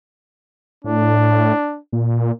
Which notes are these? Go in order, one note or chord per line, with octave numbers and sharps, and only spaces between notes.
A2 D4
A#2